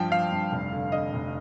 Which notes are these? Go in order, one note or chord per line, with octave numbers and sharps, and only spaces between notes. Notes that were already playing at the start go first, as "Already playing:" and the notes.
Already playing: G2 F3 G5 A5
F3 F5
G2
F1
D3
D3 D#5
F1